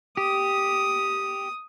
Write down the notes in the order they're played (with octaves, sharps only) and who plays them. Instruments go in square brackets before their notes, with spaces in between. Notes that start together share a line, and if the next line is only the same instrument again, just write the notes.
[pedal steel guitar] G4 [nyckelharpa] D#6